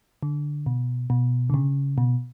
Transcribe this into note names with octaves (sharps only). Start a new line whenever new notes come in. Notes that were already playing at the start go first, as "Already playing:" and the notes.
D3
B2
B2
D3
C#3
B2